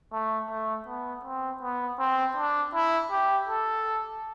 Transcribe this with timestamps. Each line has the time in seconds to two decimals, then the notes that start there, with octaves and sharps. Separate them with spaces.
0.13 A3
0.50 A3
0.88 B3
1.25 C4
1.62 B3
1.99 C4
2.37 D4
2.74 E4
3.12 G4
3.49 A4